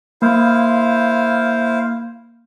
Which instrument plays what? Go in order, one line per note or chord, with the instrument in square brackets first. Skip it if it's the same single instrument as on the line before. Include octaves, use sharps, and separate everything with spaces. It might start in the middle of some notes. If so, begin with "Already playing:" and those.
[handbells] A#3 [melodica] E4 C5 F5